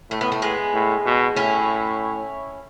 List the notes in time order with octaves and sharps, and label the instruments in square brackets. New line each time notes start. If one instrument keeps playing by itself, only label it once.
[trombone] A2 [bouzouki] A3
[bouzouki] B3
A3
G#3 B3
[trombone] A2
B2
[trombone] A2 [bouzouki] C#4 E4